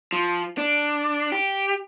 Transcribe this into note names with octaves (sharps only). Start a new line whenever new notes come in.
F3
D4
G4